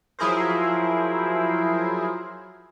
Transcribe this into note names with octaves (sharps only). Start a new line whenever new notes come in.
F3 F#3 E4 G#4 A#4 C5